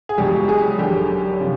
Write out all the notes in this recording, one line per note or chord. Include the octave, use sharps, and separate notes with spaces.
G#4
C#2 B2 F#3 G3 G4
G#3 G#4
G#1 F#2 D3 F#3 G3 G4
C3 F3